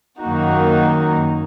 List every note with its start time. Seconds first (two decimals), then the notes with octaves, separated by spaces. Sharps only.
0.20 F#2 D#3 A#3 D#4 F#4